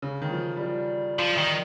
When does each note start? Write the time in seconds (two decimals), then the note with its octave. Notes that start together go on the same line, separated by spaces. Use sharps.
0.02 C#3
0.22 D#3
0.31 F3
0.56 G3
0.61 F3
1.19 F3
1.38 D#3